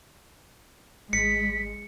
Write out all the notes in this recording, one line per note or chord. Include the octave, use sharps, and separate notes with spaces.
G#1 G#3 B6 C#7